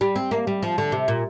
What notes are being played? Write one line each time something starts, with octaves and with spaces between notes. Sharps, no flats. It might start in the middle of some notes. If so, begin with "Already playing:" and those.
G3
C4
A#3
G3
F3
D3
C3
A#2